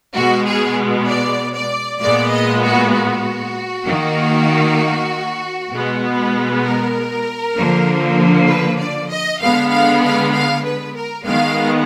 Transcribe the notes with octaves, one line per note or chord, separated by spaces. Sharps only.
B2 G#3 B3 F#4
G#4
D5
D5
A#2 G#3 B3 D5
D#5
F#4
F#4
D#3 A#3
B2 G#3 B3
A#4
D3 F3 A#3
B4
D5
D#5
D3 G#3 B3 F5
F5
F5
F5
B4
A#4
D#3 G#3 B3 F5